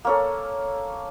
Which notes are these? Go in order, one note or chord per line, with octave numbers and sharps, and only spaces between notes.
A#3 C#4 A4